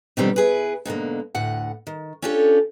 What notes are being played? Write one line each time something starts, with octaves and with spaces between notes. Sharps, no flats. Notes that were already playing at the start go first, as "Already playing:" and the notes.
B2 D3 D#3 F3 G3 C4
E4 G#4 B4
G#2 B2 D3 A#3
D2 A2 F#5
D#3
C#4 D4 F4 G4 A4